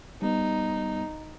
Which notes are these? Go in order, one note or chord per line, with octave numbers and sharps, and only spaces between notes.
G3 B3 D#4